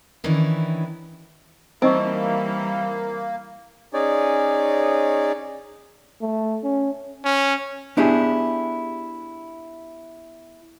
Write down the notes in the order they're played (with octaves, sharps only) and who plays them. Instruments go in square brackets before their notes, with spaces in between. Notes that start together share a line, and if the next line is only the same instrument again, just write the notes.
[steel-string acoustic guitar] D#3 E3 C#4 D4 E4
[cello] E3 G3 [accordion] A#3 [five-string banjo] C4 [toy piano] D#4 D#5 C#6
[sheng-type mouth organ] C#4 D#4 G#4 C#5 D5
[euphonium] A3
C#4
[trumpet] C#4
[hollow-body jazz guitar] B3 D4 E4 G4 G#4